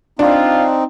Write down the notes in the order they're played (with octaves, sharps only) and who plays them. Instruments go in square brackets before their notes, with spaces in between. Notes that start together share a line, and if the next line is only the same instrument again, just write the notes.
[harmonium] C4 D#4 [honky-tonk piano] D4 [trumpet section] F4